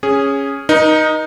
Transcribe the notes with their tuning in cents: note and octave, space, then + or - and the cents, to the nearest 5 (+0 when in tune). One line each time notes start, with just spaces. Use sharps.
C#4 +0 G#4 -10
D#4 +0 A#4 +40